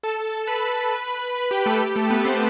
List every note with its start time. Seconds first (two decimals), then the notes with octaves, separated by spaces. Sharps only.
0.03 A4 A5
0.47 B4 B5
0.92 B4 B5
1.36 B4 B5
1.51 G4 G5
1.66 A3 A4
1.81 G4
1.96 A3 A4
2.10 B3 B4
2.25 C4 C5